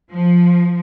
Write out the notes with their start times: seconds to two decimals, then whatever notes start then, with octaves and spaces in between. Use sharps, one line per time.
0.12 F3